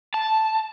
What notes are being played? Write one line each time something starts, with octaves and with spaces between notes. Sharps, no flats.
A5